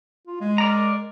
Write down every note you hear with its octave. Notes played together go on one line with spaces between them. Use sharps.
F4
G#3
A#4 D5 A#5